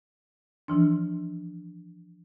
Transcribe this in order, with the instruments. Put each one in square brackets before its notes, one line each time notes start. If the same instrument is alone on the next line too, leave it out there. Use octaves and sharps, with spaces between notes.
[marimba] E3 F3 D4